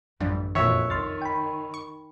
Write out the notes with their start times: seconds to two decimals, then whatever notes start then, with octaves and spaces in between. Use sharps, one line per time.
0.20 A1 F#2 E3 F3 G3 D4
0.55 F2 A#2 D#3 E3 F#4 C#5 E5
0.90 C2 D#3 C6 F6 A6
1.22 G5 B5
1.74 C#6